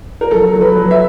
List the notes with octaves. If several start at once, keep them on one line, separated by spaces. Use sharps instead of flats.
A#4
F#3 A4
F#3
B4
F#3
E5